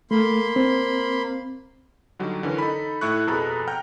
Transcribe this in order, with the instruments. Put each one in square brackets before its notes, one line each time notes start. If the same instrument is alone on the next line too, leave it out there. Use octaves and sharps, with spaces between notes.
[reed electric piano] A3 [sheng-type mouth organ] A#3 B5 C6
[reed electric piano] C4
[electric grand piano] D3 F#3 G3 D#4
D3 E3 C#4 A#4
D#4 A4 B5
A2 A3 E4 C#6 F#6
F2 B2 G#4 A4 A#5 B5
F#5 G5 A#5 F6 G6